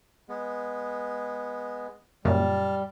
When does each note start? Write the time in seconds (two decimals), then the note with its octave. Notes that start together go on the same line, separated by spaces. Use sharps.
0.29 G#3 B3
2.25 F#2 A#2 C#3 G3 A5 F6